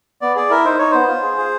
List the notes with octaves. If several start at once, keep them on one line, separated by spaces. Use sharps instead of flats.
B3 D5
G#4 D5
E4 A#4
D#4 C5
D#4 C#5
B3 C5
F4
G#4
G#4